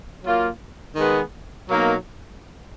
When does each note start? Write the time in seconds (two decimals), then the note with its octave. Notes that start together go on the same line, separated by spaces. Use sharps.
0.23 F#3 A#3 F4
0.96 D#3 G#3 B3
1.68 B2 F#3 A#3 D#4